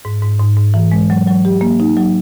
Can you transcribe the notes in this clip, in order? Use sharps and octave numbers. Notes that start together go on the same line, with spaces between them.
G#2
G#2
G#2
G#2
E3
G#3
F#3
F#3
G4
A#3
D#4
F#3